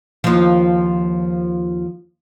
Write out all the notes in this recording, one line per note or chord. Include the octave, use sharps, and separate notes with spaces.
D#2 F3